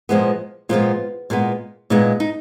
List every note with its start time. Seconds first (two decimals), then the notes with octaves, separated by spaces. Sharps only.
0.09 A#2 F3 G#3 B3
0.69 A#2 F3 G#3 B3 F4
1.30 A#2 G#3 B3
1.90 A#2 G#3 B3 D#4
2.20 D#4